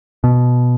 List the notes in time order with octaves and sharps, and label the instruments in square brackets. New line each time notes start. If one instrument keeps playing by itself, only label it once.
[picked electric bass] B2